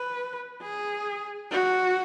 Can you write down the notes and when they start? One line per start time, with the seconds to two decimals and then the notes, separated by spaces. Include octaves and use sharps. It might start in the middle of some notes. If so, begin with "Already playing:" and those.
Already playing: B4
0.63 G#4
1.51 F#4